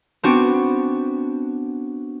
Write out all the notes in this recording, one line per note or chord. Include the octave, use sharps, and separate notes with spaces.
B3 C4 D4 F#4